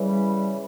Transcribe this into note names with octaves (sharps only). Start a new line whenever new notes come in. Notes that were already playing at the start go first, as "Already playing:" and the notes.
Already playing: C#3 E3 G3